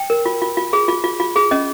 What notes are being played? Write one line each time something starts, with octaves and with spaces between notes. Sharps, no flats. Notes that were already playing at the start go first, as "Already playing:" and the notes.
Already playing: G5
A#4
F4
F4
F4
G#4
F4
F4
F4
G#4
C#4 D#5